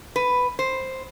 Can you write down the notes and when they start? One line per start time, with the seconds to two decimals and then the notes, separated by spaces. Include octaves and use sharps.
0.16 B4
0.59 C5